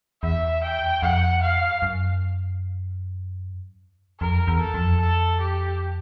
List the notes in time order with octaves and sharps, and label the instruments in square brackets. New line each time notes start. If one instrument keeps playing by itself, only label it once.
[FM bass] E2 [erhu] E5
[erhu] G5
[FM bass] F2 [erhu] F#5
[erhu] F5
[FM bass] F#2
[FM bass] F2 [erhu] A#4
[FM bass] E2
[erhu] A4
[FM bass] F2
[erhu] A4
G4